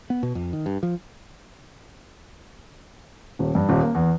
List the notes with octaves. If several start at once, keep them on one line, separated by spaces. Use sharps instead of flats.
B3
B2
F2
D#3
G2
F3
D#1
G2
D#1
A#3
E2